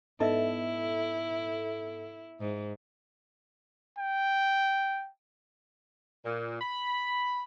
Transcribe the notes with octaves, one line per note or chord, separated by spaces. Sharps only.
G#2 B3 D#4 E4 A4 D#5 E5
G#2
G5
A#2
B5